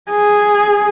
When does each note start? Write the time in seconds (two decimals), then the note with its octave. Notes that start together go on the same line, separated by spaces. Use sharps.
0.11 G#4